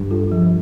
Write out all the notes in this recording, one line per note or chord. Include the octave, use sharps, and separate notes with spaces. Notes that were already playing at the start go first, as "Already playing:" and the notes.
Already playing: G2
F4 A4
F3